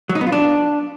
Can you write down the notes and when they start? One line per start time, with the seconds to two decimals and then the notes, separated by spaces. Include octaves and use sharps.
0.09 F#3
0.15 D#4
0.21 B3
0.27 F4
0.32 D4